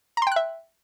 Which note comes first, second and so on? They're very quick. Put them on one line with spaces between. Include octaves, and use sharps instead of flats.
A#5 C6 G5 F#6 E5